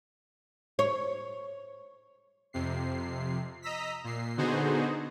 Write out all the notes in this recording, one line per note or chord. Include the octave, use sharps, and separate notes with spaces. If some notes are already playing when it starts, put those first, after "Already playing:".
C#5
F2 C3 C7
D#5 A#5 E6 B6
A#2 C7
D3 B3 D#4 F#4 G#4 C5